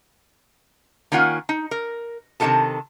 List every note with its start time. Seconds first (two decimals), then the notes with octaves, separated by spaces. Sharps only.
1.12 D#3 A#3 C#4 F4 F#5 G#5
1.49 D#4
1.71 A#4
2.40 C3 D#3 C#4 F#4 A4 A5